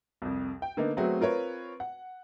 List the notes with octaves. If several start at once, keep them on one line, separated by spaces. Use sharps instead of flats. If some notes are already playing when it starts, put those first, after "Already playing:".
C2 F2
G5
D3 A#3 B3 D#4
F#3 A3 B3 C4 F#4 G#4
C4 F4 A#4 B4 C#5
F#5